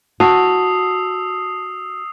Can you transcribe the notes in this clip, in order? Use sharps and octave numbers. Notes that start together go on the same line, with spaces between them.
F#4 A5 D#6 E6 C7